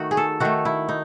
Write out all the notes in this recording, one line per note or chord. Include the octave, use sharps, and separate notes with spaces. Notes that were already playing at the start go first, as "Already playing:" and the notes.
Already playing: D#3 A3 D#4 F#4
G#4
A4
D#3 A3 F#4
E4
D#4